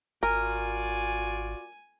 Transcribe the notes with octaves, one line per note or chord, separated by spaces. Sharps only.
G#1 F4 F#4 A#4 D5 G#5